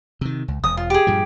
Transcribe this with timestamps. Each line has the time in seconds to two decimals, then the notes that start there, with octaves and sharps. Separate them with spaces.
0.21 C3 D#3
0.48 C#2
0.64 E1 D#6
0.77 F4
0.90 G4 G#4
1.07 G2 A#2 F3